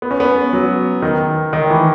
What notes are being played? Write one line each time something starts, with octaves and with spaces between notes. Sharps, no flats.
B3
C#4
B3
F#3
D#3
D#3
E3